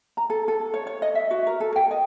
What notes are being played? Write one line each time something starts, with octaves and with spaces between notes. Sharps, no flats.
A#5
A4
A4
C#5
C#5
D#5
E5
F#4
A#4
A4
G5
D#5